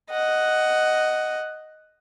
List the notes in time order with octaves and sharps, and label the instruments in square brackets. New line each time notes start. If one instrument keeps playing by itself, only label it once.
[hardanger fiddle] D#5 F#5